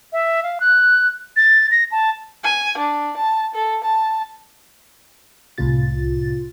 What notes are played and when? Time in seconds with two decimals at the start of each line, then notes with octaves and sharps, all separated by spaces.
0.13 E5
0.43 F5
0.60 F#6
1.37 A6
1.71 A#6
1.92 A5
2.44 G#5
2.78 D4
3.17 A5
3.54 A4
3.84 A5
5.58 C2 A2 C3 F4 A6